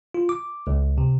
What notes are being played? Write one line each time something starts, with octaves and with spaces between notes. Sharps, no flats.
F4
D6
C#2
C3